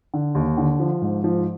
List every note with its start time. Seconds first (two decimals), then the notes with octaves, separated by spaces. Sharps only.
0.14 D3
0.35 D#2
0.58 D3
0.80 F3
1.01 G#2
1.24 F3